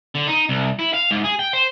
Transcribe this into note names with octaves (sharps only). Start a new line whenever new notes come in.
D3
D#4
C2
E4
F5
G#2
G#4
G5
C5